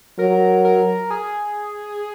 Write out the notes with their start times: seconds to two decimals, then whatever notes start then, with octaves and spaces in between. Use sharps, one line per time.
0.19 F#3 A#4
0.65 A#4
1.10 G#4